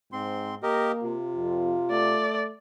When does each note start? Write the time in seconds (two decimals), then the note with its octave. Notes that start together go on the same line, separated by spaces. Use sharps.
0.12 G#2 C4 C6
0.63 A#3 G4 A#4 D#5
1.03 C3 F4
1.36 F2
1.91 A3 D5